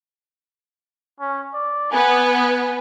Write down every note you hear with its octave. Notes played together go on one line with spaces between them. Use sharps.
C#4
D5
B3 G#5